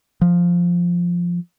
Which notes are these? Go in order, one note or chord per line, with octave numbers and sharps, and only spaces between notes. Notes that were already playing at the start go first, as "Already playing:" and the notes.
F3